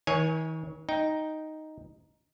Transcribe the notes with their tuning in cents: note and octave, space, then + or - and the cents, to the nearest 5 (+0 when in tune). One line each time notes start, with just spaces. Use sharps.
D#3 +45 C#5 +0 G#5 +0
D#4 +0 G5 +0